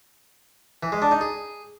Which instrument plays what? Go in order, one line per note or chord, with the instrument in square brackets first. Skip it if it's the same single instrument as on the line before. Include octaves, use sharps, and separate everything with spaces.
[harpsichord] E3
G#3
D4
D#4
G#4